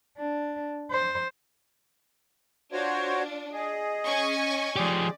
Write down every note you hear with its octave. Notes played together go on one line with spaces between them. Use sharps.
D4
C5
D4 F4 F#4 C5 C#5
G#4 D#5
C#4 G#5 C#6
F3 G#3 G4 G#4 D5